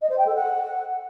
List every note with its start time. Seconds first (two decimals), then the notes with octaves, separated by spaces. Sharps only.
0.01 D#5
0.09 C5
0.17 G5
0.26 A4
0.34 F#5